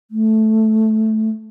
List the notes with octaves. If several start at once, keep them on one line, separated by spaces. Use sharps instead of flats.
A3